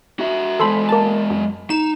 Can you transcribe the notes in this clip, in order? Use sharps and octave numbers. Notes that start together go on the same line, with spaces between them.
F#4 E5
E3 G#3 A4 C5 B5
A#3 A5
F#2
D#4 E7